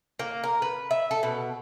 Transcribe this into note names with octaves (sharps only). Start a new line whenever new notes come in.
A#3
A#4
B4
E5
A4
B2